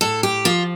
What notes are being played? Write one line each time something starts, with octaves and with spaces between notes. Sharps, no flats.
A2 A4
G4
F3 F4